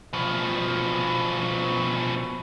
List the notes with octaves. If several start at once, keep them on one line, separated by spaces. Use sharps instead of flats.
B2 F3